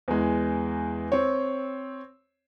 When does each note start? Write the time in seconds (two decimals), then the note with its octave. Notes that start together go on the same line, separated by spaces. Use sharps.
0.08 E2 G#3
1.12 C4 C#5